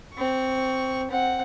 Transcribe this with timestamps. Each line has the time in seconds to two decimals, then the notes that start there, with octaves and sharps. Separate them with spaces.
0.14 C4 C#6
1.11 C4 F#5